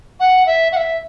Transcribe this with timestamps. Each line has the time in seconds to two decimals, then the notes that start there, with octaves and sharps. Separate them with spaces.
0.20 F#5
0.46 E5
0.72 F#5
0.77 E5